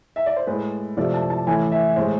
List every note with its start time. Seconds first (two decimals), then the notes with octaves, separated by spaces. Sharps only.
0.16 E5
0.26 D5
0.36 C5
0.47 A2 G#3 B4
0.97 C3 F3 A3 D5
1.14 A5
1.30 A5
1.46 A2 E3 A3 G#5
1.72 E5
1.96 A2 G#3 C5